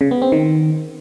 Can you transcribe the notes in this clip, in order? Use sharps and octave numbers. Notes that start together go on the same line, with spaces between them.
C#3
B3
C4
D#3